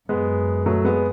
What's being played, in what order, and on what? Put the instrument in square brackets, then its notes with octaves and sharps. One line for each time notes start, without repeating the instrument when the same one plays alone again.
[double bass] F#2 [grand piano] G#3 B3
[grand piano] F#3 A3
G#3 B3